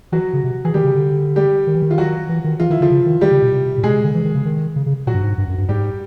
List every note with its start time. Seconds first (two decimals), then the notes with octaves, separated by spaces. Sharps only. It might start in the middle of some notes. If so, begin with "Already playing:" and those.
0.12 E3 F#3 F#4
0.33 C#3
0.44 C3
0.64 E3 G#4
0.74 D#3 G3 G4
0.85 C#3
0.95 D3
1.36 G3 G4
1.67 D#3
1.75 E3
1.82 D#3
1.91 F4
1.98 F#3 F#4
2.29 E3
2.44 D#3
2.60 E3 F4
2.70 D#3 E4
2.81 D3 F3 F4
2.91 C#3
3.06 D#3
3.21 D#3 G3 G4
3.31 C#3
3.42 B2
3.52 C3
3.78 A#2
3.83 B2 G#3 G#4
3.94 C3
4.04 D3
4.14 E3
4.25 D#3
4.35 C#3
4.45 D#3
4.76 C#3
4.86 C#3
5.07 A#2 F#3 F#4
5.15 G2
5.23 G#2
5.38 G2
5.48 F#2
5.58 G2
5.69 G#2 G3 G4